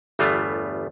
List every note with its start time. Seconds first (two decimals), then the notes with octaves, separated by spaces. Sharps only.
0.19 G1 E2 G3 A3 B3 F4